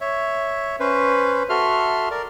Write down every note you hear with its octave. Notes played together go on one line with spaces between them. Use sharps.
C#5 E5
C#4 B4 C5
F#4 A4 E5 C6 F6
A#4 D5